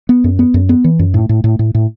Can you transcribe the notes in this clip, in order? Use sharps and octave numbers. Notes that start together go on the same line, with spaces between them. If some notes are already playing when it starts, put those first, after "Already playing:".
B3
F#2
B3
F#2
B3
E3
F#2
A2
A2
A2
A2
A2